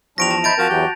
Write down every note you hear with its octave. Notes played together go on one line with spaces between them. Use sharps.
E2 F3 G3 D4 C#6 A#6 D7 F7
A5
D#4 C5 E5 B5 G6 A6 D7
F3 C4 F#4 A#4
E2 E3 F#3 G4